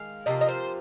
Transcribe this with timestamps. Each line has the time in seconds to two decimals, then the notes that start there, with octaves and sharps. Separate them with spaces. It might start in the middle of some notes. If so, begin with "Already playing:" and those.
Already playing: D#3 G#3 F5
0.26 C3 F3 A#3 F4 D#5
0.41 D#5
0.48 C5